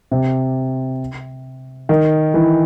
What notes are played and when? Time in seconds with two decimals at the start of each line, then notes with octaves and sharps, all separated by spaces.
0.11 C3
1.89 D#3
2.34 E3